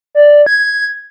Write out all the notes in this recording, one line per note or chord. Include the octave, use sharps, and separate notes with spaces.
D5
G#6